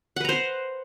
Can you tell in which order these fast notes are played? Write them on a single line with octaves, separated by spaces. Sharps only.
F#5 B4 A#5 C5